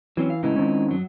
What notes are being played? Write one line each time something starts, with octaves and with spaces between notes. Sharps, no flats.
E3 F#3 C4 C#4
F5
A1 C#3 E3 G#3 D#4 E4
D#3 C4 C#4
F#2 F#3